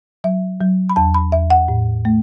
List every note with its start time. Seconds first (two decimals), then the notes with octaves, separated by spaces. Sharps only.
0.24 F#3 E5
0.61 F#3
0.89 B5
0.96 E2 A5
1.14 B5
1.32 E2 E5
1.50 F#5
1.68 A2
2.05 A3